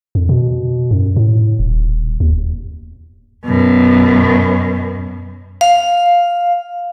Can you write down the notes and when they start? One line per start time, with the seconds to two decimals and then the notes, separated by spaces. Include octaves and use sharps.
0.15 F2
0.29 B2
0.91 F#2
1.16 A2
1.59 D#1
2.20 D#2
3.46 F#2 B2
5.61 F5